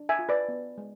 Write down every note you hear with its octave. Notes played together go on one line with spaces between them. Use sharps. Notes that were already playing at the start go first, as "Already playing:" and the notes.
Already playing: D4
E5 G#5
F4
B4 D5
B3
G#3